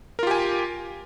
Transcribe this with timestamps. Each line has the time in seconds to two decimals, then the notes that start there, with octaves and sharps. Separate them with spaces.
0.19 A#4
0.23 F4
0.27 G4
0.31 G#5